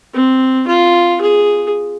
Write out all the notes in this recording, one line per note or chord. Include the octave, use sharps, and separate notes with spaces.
C4
F4
G#4